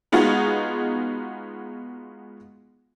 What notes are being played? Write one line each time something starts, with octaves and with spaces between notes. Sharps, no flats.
G#3 B3 D#4 F4 F#4 G#4